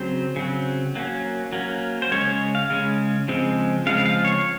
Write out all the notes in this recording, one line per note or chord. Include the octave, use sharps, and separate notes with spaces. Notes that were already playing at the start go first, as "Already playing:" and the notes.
Already playing: C#3 F#3 C4 C5
C#3 F#3 C4
F#3 A#3 C#4
F#3 A#3 C#4
C5
C#3 G#3 C#4 C#5
C#5
F5
C#3 G#3 C#4
C#3 F3 G#3 C4
C#3 F3 G#3 C4 F5
F5
C#5